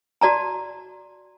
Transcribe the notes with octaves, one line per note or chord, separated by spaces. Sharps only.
F#4 D5 A5 A#5